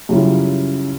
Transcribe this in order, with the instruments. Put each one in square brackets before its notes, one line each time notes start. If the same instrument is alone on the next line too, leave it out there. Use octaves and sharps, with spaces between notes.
[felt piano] F#2 C#3 G3 E4 F4